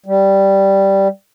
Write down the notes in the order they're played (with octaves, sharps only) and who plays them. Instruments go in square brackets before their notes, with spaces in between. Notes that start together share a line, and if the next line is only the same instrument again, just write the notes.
[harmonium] G3